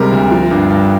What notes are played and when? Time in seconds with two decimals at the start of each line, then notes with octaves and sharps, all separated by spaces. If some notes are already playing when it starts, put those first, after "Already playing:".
Already playing: C3 G3 G#3 A#4
0.12 D2
0.31 F3
0.51 G2
0.70 G2